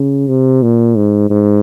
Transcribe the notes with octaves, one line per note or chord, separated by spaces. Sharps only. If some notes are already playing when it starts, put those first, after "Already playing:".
Already playing: C#3
C3
A#2
G#2
G#2